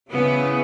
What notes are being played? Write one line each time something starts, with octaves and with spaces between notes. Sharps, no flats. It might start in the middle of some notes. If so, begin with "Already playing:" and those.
C#3 E3 B3